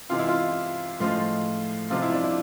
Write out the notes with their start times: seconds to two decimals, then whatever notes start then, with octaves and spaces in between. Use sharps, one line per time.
0.10 C3 E3 G#3 F4
0.19 E4
0.28 F4
1.00 A2 F3 G#3 F4
1.90 C3 F3 G#3 F4
2.02 E4
2.13 D4
2.23 E4